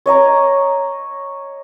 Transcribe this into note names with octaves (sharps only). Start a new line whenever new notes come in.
C#5 D#5 A#5 D6